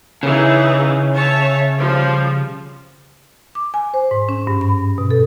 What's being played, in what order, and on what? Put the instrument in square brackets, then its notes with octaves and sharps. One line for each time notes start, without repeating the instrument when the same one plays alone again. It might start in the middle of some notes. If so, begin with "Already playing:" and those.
[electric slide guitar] C#3 [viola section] E3 D#4 G#4
[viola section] C#5 E5 A5
F3 G3
[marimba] D6
G#5
C5
G#2
C#4
G2
B5
B2
A4